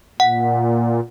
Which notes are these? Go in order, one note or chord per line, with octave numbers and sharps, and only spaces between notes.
A#2 F#5